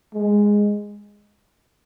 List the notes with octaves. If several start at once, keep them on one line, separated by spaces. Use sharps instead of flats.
G#3